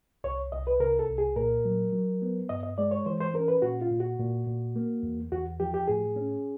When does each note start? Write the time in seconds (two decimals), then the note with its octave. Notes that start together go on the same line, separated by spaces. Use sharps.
0.24 C2 C#5
0.52 C2 D#5
0.67 B4
0.80 C3 A#4
0.99 A4
1.09 C2
1.18 G#4
1.36 A#2 A#4
1.65 F#3
1.93 F#3
2.22 B3
2.49 G2 D#5
2.63 D#5
2.78 G#3 D5
2.91 C#5
3.06 E3 C5
3.21 C5
3.34 C#4 A#4
3.48 B4
3.62 A#2 F#4
3.82 F4
3.91 A#2
4.00 F#4
4.19 A#2
4.47 A#2
4.76 A#3
5.03 E2
5.32 E2 F#4
5.60 F3 G4
5.74 G4
5.87 A2 G#4
6.16 C#4